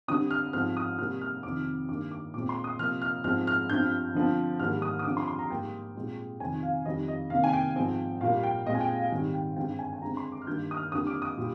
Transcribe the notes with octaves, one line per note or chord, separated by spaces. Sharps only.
D3 G3 C4 D#6
F6
G#2 F3 C4 F6
D#6
C3 G3 A#3 F6
F6
F2 C3 D#3 D6
G2 D#3 A#3 D6
D6
A#2 G#3 C4 D6
C6
D#6
C3 F3 A#3 F6
F6
G#2 F3 G#3 C4 F6
F6
G2 F3 C4 G6
D3 F3 C4
G#2 D#3 G3 A#3 F6
D#6
D#6
D3 F3 C4 D6
C6
C6
A#5
G#2 G3 A#3 G5
A#2 G#3 C4
F2 C3 D#3 G#5
F5
F2 D#3 G3 D#5
D#5
C3 D#3 A#3 F5
G#5
G5
G#2 F3 C4
A#2 G3 A#3 F5
G5
A#2 G#3 C4 D#5
G#5
G5
F5
G#2 D#3 G3 C4
G5
G2 D3 G#3 C4 G5
G#5
G#5
D3 G#3 C4 A#5
C6
D6
F6
G2 D#3 G3 A#3 G6
D#6
F6
F2 D3 G3 A#3 D#6
D6
D#6
A#2 G3